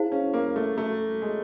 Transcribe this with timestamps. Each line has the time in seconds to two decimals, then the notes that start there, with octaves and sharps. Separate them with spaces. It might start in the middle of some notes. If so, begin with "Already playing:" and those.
Already playing: E4 G#4 C5 F5
0.12 C#4
0.34 A#3
0.56 A3
0.78 A3
1.22 G#3